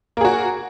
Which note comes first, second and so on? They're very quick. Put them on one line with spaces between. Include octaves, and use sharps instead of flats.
A#3 G#4 F#4